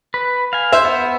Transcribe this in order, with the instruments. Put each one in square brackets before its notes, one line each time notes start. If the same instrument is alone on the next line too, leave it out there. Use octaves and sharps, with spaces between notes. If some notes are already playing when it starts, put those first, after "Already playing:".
[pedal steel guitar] B4
F5 G#5
[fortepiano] C5 E5
[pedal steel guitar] B3